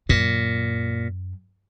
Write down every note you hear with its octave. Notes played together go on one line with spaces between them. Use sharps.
F#2 A#2